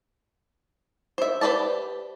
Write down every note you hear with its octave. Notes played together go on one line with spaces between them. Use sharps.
C5 E5
G4 B4 C5 D5 A5